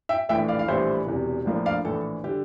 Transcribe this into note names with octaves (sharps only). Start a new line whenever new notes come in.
E5 G5
A#1 A2 E3 A3 E5 G5
D5 F5
F5
A#1 A2 E3 G3 C5 E5
E1 E2 C3
A#1 A2 F3 A#3 D4
D5 F5
A#1 A2 E3 A4
D3 G3 G4